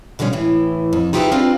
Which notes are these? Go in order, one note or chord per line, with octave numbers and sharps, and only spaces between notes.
B2 D3 F3 G3 C#4
A2 E3
F2
D#4 F4 G4 G#4 B4 E5
C4 D4 F4 B4